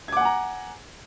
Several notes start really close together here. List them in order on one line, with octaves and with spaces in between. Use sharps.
G#6 D6 F#5 G#5 A#5